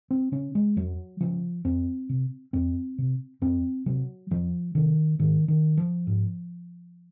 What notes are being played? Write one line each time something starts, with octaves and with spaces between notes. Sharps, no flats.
C4
C#3 C#4
G#3
F2 F#3
C#3 F3
F2 C4
C3
F2 C4
C3
F2 C4
C3 F#3
F2 F3
C3 D#3
G#2 D#3
D#3
F3
G#2